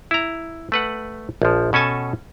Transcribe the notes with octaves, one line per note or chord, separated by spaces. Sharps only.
E4 A#5
A3 B4 F#5
A#1 F3
B2 C#4 A4 G#5 A5